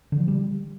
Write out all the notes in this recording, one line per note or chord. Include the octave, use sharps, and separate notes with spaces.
D3
F3
G3